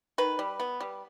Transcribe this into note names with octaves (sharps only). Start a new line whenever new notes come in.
D#3 B4
G3
B3
G3